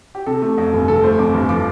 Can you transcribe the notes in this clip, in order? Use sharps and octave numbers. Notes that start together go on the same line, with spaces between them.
G4
C3 A4
A3
F2
G1
C3 A4
A3 C5
F2 D6
G1
F3 D6